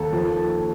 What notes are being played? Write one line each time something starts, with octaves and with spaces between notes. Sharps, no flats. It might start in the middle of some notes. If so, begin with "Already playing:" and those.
Already playing: D#2 A4
F3